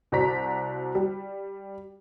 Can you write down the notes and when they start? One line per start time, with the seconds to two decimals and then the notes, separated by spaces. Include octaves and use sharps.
0.12 C2 F#4 C5 D5 A#5 B6
0.95 G3